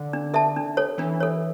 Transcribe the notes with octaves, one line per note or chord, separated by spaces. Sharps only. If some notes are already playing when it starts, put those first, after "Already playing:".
Already playing: D3
D4
A4 E5 A5
D4
A4 C#5
E3 D4
A4 C#5